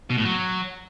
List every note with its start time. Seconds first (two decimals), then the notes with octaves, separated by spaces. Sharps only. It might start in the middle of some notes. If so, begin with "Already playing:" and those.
0.10 B2
0.18 A2
0.25 F#3